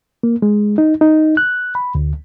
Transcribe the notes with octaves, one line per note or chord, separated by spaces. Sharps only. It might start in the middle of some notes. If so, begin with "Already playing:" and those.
A#3
G#3
D#4
D#4
F#6
B5
D2